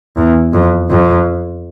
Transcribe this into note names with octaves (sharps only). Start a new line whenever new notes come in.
E2
F2
F2